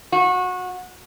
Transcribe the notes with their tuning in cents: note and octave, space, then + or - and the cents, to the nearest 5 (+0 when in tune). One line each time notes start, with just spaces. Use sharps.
F#4 -25